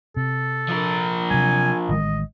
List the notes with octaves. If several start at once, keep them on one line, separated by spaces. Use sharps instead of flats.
C3 A4
F3 A#4
C3 F#3 G#5
A1 D#3 G#3 D#5